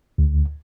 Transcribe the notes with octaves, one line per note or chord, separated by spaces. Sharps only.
D2